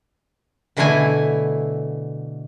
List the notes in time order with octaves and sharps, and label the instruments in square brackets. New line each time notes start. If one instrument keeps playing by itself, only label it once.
[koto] B2 D3 E3 A3 E4 G#5